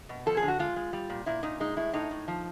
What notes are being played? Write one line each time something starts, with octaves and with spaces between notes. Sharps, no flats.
B2
F3 A4
G#4
D3
F#4
G#3 F4
G#3
G3
A#2
A#2 E4
A#2 D#4
G#3 D#4
A2 E4
A2 D#4
A2
F3